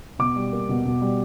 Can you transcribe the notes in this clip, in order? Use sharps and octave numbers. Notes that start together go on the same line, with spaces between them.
B2 D6
G3
A#3
B2
B2
G3